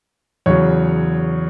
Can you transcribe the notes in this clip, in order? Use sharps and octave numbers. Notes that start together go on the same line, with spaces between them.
E2 C#3 F#3 C#5